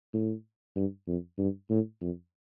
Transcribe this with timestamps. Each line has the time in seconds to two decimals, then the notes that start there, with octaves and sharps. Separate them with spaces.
0.13 A2
0.76 G2
1.07 F2
1.38 G2
1.70 A2
2.01 F2